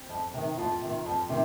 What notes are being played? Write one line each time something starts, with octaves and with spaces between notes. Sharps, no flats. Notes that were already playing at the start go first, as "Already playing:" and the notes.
Already playing: C4
F2
C3 D#3
F2 F4
C3 D#3
F2
C3 D#3